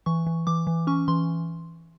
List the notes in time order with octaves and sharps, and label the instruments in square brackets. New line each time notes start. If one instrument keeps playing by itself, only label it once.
[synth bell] E3 C#6
E3
E3 D6
E3
C#4 C#6
E3 C6